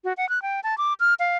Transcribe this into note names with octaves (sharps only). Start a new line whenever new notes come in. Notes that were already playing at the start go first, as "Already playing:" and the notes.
F#4
F#5
F#6
G5
A5
D6
F6
F5